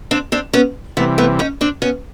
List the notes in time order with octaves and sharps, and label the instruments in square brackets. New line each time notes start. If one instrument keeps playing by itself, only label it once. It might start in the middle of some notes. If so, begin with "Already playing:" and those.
[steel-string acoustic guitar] C4 D4
C4 D4
B3 C#4
[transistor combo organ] C3 E3 G3 [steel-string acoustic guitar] A3 B3
[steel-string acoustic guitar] A3 B3
C#4 D#4
C4 D4
B3 C#4